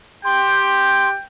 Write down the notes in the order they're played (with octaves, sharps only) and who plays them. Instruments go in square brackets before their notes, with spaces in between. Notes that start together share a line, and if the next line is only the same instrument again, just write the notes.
[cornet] G4 [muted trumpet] G5 [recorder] C6